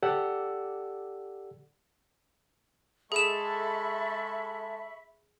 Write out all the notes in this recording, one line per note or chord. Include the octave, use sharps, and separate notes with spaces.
G4 A4 D5 F#5 E6
G#3 G#4 A4 E5 B5 C#6 E7